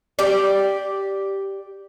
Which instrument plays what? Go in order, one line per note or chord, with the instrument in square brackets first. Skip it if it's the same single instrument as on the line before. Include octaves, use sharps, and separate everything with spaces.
[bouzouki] G4 D5